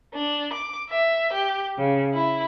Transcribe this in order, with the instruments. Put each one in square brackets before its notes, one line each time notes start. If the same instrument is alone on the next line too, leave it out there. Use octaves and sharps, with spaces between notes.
[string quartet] D4
D6
E5
G4
C#3
E4